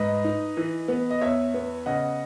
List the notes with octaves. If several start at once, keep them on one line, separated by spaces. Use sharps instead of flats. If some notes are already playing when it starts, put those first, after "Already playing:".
Already playing: G#2 B4 D#5
D#4
E3
B3
D#5
E2 C#5 E5
B3
C#3 D#5 F#5